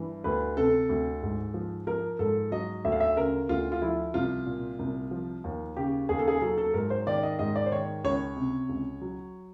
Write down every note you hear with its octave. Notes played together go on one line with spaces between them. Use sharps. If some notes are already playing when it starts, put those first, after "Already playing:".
Already playing: G2 E3
D2 B4
C3 A4
D2
G#2
F3
F3 A#4
G#2 A4
F#3 D#5
D2 E5
F5
E5
C#3 A#4
D2 F4
F4
F3 E4
C2 F4
A#2
C2
F3
D#2
C#3 G4
D#2 G#4
A4
G#4
F#3 A4
A4
G#2 A#4
C5
D#3 D5
D#5
G#2 D#5
D5
C5
D#3 C#5
C#2 C#5
C3
C#2
F#3